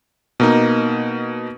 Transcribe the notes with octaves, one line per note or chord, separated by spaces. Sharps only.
B2 A#3 D#4